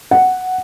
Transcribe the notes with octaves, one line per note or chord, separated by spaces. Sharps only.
F#5